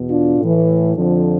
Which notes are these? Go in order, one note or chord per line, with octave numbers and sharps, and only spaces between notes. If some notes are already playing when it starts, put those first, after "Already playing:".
Already playing: E2 B2
D4 F4
A2
E3
F2 D3 F3